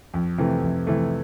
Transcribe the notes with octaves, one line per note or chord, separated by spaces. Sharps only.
F2
C3 E3 A3
F2
C3 E3 A3